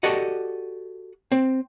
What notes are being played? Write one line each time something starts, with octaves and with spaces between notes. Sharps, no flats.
F#4 G4 A4 D5 D#5 F#5
C4